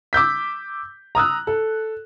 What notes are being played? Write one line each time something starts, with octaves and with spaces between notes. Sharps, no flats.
D6 E6 G6 B6
A#5 D#6 E6 F#6
A4